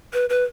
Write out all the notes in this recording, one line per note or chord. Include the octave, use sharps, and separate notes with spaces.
B4
B4